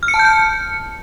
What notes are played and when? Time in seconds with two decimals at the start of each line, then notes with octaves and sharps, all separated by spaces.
0.03 F6
0.08 C#7
0.14 A5
0.19 G6
0.25 C#7